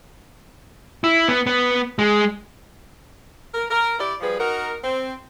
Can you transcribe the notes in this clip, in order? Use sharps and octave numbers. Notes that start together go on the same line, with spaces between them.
E4
B3
B3
G#3
A#4
A#4
E4 G4 D5
F3 G3 G#4 B4
D#4 F#4 A#4
C4